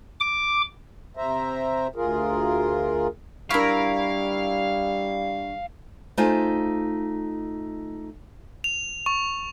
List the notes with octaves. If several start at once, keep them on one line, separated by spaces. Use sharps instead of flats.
D6
C3 C5 E5 A#5
D2 F4 G#4 A#4
G3 D4 E4 A#4 F5 C#6
A3 D#4 F4 C5 G#5
F7
C#6